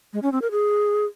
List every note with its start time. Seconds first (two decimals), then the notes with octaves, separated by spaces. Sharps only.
0.13 G#3
0.23 C#4
0.32 C4
0.42 A#4
0.51 G#4